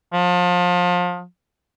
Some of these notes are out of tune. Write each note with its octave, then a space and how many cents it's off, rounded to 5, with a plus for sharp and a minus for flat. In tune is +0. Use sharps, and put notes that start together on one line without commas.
F3 +30